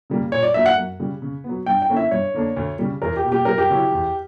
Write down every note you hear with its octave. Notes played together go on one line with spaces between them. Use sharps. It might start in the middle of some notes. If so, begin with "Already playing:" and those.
C#3 G3 A#3
A#2 C#5
D5
F#3 A#3 D4 E5
F#5
F#2
C#3 G3
C#3
F#3 B3
G2 G5
G5
D3 A#3 C#4 E4
E5
G2 C#5
D3 A#3 D4
D2
C#3 G3
E2 A#4
G4
B2
A#3 G4
F#2 A#4
G4
C#3 F#3 C#4 E4
E2